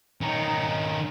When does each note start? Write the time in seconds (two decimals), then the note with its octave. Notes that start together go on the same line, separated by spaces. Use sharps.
0.21 D#3 C#4 D#4